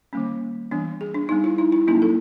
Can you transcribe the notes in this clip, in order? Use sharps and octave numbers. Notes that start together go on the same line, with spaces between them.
D#3 G3 A#3 C#4
E3 G3 B3 D4
G#4
D4
G3 B3 D4 D#4
E4
D#4
E4
F#3 A#3 C#4 D#4
A4